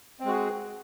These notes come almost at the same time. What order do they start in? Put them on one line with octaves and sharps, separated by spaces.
C4 G#3 F#4 G#4